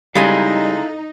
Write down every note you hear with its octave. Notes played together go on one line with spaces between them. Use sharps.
C#3 G3 G#3 D#4 E4 A4 F5 G#5